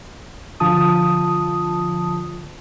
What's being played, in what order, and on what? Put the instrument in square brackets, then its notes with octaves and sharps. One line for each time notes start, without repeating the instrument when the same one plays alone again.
[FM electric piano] D3 F3 F4 A5 D#6